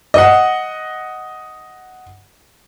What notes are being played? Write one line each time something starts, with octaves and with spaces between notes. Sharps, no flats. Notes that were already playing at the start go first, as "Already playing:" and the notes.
D#5 F#5